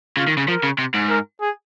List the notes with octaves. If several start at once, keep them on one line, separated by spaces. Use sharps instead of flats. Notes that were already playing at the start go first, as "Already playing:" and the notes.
C#3 F4
D#3
C#3
F3 A#4
C#3
C3
G#2
A#4
G#4